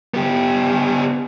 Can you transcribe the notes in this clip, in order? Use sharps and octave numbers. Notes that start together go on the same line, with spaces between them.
B3 G4